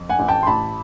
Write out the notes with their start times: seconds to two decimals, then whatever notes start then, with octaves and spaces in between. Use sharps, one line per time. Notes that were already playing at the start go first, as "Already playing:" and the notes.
Already playing: F2
0.09 F#5 G#5
0.19 A1
0.28 G5 A5
0.43 C6
0.47 A1 A5 B5